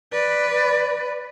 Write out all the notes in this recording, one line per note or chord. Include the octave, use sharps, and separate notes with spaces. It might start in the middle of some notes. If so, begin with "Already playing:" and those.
B4 D5